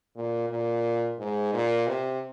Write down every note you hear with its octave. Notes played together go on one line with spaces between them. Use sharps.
A#2
A#2
G#2
A#2
C3